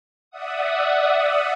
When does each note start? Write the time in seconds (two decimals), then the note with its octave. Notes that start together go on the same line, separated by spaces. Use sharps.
0.31 D5 E5 F#5 D#6